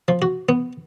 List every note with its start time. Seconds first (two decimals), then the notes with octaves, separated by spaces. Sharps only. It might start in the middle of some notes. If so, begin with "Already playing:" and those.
0.08 F3
0.22 F#4
0.49 B3